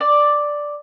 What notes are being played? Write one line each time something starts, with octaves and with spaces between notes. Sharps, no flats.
D5